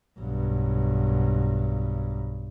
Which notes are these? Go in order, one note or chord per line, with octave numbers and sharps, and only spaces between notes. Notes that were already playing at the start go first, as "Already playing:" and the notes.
B1 G2